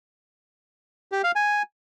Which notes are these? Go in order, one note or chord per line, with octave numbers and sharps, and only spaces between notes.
G4
F5
G#5